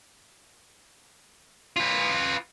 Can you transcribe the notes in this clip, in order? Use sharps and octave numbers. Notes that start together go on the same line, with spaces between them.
F4 B4